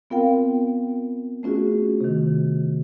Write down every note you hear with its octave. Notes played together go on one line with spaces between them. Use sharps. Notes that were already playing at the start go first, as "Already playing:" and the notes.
B3 C4 F4 A#4 F5 G5
A3 C#4 F4 F#4 G#4
C3 D#3